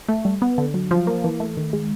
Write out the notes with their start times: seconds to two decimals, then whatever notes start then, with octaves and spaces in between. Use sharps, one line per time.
0.09 A3
0.25 G3
0.42 B3
0.58 D3
0.74 F#3
0.91 F3
1.07 A#3
1.24 E3
1.40 A3
1.57 D#3
1.73 G#3